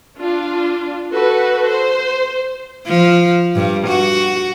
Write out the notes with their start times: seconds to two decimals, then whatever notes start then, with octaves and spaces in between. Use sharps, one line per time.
0.20 D4 F4
1.13 F#4 A4 B4
1.68 C5
2.87 F3
3.55 G2
3.87 F#4